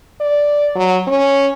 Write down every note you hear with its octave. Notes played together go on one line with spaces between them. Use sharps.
D5
F#3
C#4